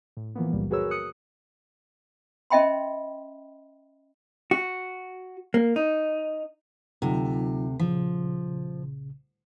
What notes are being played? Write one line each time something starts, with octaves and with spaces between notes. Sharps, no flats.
A2
E3 F3 A#3 B3
C#2 F#2 A#2 G3 A#3
F#4 G#4 A#4 B4 C#5 E6
D#6 F#6 C#7
C#4 D#5 E5 G5 B5 C6
F#4
A#3
D#4
D2 C3 F#3 D#4 F4
B1 A#2 C#3 F3